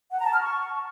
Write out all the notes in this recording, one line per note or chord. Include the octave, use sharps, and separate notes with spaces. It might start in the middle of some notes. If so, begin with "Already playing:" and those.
F#5
A#5
A5
F6
C#6